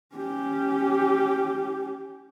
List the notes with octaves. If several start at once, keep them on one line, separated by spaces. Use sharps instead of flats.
C#4 G4